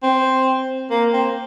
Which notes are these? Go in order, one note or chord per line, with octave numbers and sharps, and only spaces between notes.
C4
A#3
C4